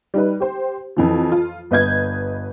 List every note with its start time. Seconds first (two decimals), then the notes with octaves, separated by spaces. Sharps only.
0.14 G3 D#4 B4
0.40 G4 C5
0.97 F2 E3 F3
1.32 F4
1.71 G1 B4 D#5 G6 G#6